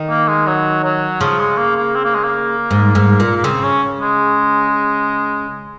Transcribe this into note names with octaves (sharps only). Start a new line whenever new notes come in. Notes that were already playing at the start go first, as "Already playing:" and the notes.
Already playing: D#3
A#3
G#3
F#3
F#3
C#3 F3
G#3
A#3
A#3
C4
A#3
G#3
A#3
G#2
G#2
A#2
A#3
C#3 C4
C#4
G#3